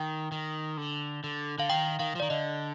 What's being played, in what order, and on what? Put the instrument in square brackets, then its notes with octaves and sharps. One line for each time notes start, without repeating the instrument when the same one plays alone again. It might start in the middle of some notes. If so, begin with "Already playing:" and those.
Already playing: [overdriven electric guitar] D#3 [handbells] G5
[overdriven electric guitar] D#3
D3
D3
[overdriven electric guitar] D3 [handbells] F5
[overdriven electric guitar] D#3 [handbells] G5
[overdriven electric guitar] D#3 [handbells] F5
[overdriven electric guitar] F3
[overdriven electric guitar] D#3 [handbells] D5
[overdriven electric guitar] D3 [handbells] D#5